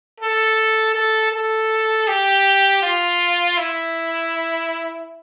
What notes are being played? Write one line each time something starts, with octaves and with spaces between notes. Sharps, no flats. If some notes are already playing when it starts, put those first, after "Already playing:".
A4
A4
A4
G4
F4
E4